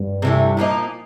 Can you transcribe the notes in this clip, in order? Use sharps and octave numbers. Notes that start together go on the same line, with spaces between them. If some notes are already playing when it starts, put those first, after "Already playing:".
Already playing: G2
C3 E3 A3
A#2 F3 A#3 D#4